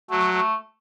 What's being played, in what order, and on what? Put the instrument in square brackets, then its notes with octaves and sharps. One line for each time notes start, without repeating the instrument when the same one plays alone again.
[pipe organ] F#3 [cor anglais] A3
[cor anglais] A3